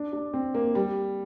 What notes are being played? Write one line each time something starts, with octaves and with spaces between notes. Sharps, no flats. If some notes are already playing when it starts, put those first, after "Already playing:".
Already playing: D4
D4
C4
A#3
G3